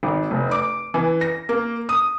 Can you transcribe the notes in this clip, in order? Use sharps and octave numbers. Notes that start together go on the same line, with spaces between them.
G#1
F1
D6
E3
A#6
A#3
D#6